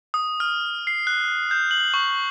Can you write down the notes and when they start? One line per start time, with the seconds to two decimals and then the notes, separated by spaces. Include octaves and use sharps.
0.14 D#6
0.40 F6
0.87 C7
1.07 F#6
1.51 G6
1.71 F#7
1.94 C#6